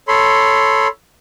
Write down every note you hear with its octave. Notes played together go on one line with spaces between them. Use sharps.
A4 C#5 B5 C6